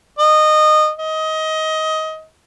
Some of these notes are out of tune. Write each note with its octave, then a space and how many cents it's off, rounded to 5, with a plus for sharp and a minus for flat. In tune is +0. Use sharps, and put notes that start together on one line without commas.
D#5 -20
D#5 +20